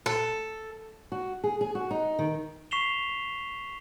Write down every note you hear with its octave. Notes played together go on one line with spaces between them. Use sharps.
A4
F#4
G#4
G#4
F#4
D#4
D#3
C#6 B6 C7 E7 F7 G7